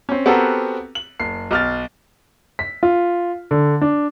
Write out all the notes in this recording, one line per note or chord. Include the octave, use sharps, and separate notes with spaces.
C4 C#4
B3 C4 F#4 G4 A4 A#4
F#7
F#1 C7
B1 F6 A6
B6
F4
D3
D4